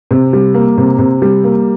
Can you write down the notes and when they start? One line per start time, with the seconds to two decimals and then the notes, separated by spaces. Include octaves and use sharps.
0.11 C3
0.33 G3
0.54 A#3
0.78 C3
0.99 C3
1.22 G3
1.44 A#3